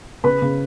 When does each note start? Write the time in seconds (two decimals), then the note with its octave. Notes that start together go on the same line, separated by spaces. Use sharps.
0.24 C#3 B4 B5
0.42 C#3